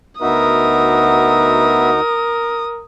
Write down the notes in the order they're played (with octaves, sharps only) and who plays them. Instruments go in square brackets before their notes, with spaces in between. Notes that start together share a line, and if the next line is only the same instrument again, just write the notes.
[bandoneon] D2 D#4 F#4 [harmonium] B3 E5 [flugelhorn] A#4 [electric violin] D#6